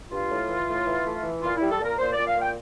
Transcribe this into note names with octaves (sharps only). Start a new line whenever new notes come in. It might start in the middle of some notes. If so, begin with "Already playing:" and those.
G2 F4
A2
E3
A2
E3
A3
E3
A#2 F4
G3 E4
A4
A#2 A#4
A#2 C5
A#2 D5
F5
A#2 G5